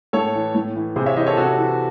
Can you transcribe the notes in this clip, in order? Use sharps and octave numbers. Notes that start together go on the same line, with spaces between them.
A2 A4 C#5
E3
A2
E3
C3 G#4 C5
C#5 E5
E3 C5 D#5
A4 C#5
C3 F#4 A4
E3